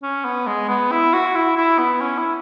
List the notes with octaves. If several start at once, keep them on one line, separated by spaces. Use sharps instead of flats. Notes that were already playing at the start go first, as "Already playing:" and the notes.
C#4
B3
G#3
B3
E4
F#4
E4
E4
B3
C#4
E4